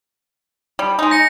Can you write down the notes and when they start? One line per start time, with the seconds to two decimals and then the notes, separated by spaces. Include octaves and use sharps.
0.79 G3
0.99 G#3 D#4
1.11 A#6 C#7